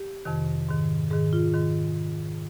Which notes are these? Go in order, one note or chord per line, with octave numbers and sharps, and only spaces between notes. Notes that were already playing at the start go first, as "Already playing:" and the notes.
Already playing: G4
F2 C3 D#3
G#2 D#3
G#2 D#3 G#4
F4
G#2 D#3